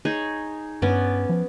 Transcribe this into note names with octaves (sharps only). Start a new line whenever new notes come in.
D#4 G#4 C#5
G2 B3 C#4 D5
F3